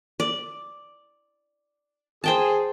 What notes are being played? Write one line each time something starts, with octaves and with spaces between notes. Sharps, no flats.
D5
G#4 C5 G5 A5